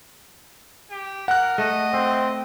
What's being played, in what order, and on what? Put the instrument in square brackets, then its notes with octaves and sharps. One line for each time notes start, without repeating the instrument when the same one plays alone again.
[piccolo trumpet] G4
[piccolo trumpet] A#4 [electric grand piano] F#5 F#6
[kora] A3 [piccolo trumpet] D#5
[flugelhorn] C4 [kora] E5